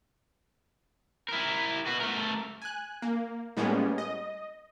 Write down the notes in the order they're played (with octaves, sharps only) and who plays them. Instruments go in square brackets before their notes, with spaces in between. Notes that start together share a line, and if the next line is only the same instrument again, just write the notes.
[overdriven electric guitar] E4 A#4
F#4 B4
A3 A#4
[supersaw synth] G#5 F#6
A#3
A2 G3 G#3 A#3 B3 C#4
D#5